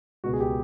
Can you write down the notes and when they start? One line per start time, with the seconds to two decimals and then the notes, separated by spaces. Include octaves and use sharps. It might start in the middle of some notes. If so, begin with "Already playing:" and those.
0.24 C#2 B2 F#4
0.33 G#4
0.40 G4